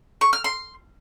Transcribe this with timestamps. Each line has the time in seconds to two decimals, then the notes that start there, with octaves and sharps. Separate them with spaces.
0.21 C#6
0.33 F6
0.44 C6